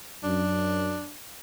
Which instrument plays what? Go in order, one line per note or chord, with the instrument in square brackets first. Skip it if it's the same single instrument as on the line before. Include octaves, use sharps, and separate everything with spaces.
[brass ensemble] F#2 [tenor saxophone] D4